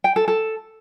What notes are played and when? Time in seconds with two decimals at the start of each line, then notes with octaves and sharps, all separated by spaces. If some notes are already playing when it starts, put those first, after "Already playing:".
0.04 G5
0.16 A4
0.28 A4